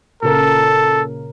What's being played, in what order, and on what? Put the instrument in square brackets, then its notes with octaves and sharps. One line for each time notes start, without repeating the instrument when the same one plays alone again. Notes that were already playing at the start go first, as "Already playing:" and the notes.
[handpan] A#2 C#3 A#4 [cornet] A4